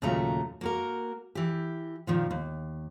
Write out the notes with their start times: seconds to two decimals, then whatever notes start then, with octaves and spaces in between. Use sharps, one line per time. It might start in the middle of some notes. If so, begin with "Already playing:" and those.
0.02 D#2 A#2 C#3 F#3 A3 A#5
0.61 A#3 F#4 A#4
1.35 E3 G4
2.07 A#2 D#3 F3
2.31 D#2